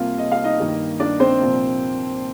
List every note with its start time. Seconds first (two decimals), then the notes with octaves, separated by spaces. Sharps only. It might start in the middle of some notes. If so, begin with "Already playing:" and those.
Already playing: C2 C3 G3 A#3 F4 F5
0.18 D#5
0.32 F5
0.44 D#4 D#5
0.59 G2 D#3 G3 A#3
1.00 D4 D5
1.20 C4 C5
1.40 C2 A#2 F3 A#3